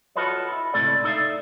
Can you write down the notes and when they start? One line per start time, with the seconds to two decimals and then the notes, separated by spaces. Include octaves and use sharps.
0.16 F4 F#4 A4 B4 C#5 D#5
0.52 E4
0.74 C#2 A2 C3 A4 D5
1.04 D#4 A4 D5 E5 F5